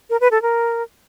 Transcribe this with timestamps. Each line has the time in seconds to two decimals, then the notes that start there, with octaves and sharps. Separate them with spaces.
0.10 A#4
0.21 B4
0.31 A4
0.42 A#4